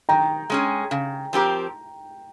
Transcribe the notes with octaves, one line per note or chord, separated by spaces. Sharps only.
D#3 G5 A#5
G#3 C#4 G#4
C#3
F3 C4 G4 A#4